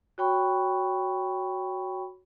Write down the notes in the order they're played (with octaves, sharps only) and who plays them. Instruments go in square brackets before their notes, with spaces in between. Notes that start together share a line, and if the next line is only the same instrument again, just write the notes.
[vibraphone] F#4 C#5 G5 B5 C#6